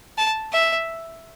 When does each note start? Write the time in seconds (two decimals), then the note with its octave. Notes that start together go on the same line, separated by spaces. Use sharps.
0.18 A5
0.53 E5